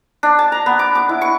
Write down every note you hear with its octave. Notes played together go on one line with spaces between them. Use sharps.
D4
A5
A#5
B3
D6
D6
E4
C#6